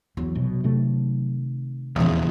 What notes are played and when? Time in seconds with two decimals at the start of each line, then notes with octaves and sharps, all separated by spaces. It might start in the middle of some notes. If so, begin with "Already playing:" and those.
0.17 E2 F#3
0.35 F1 B1 B2
0.64 C3 D#3 A3
1.96 D#1 E2 C#3 F3